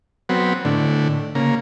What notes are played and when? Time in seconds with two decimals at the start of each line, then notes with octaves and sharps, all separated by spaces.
0.29 F#3 B3 C4
0.65 A2 D3
1.35 C#3 A#3